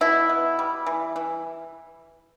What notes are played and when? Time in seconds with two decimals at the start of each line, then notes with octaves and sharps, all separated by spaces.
0.01 B2 E4
0.29 B3
0.59 G3
0.86 E3
1.16 E3